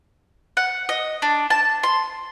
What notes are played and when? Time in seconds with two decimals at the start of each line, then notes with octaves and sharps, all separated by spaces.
0.57 F#5
0.89 D#5
1.22 D4
1.50 A5
1.83 C6